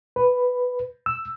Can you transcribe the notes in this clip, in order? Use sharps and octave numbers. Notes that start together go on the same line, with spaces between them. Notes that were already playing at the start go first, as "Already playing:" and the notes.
B4
E6